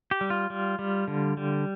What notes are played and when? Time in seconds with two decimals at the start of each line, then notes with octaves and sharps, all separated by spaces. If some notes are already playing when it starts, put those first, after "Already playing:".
0.11 G4
0.21 G3
0.30 F4
0.50 G3
0.79 G3
1.08 D3
1.37 G3